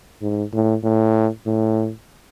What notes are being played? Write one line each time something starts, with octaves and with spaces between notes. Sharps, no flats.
G#2
A2
A2
A2